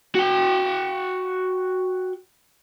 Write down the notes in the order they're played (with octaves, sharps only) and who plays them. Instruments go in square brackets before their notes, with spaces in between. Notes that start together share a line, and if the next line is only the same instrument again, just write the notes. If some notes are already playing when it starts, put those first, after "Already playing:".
[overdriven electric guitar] F#4 G5